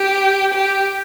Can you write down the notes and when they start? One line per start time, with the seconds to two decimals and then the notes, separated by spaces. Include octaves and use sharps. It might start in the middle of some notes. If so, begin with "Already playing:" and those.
Already playing: G4
0.55 G4